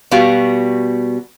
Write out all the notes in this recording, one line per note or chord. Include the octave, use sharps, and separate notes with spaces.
B2 G3 B3 F#4 F5